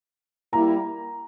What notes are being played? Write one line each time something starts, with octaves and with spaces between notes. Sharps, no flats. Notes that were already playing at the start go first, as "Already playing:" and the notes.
G3 A#3 E4 A#5